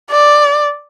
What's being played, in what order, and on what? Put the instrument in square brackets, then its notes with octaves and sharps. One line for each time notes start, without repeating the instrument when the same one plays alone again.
[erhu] D5